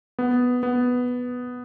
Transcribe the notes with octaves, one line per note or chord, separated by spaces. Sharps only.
B3
B3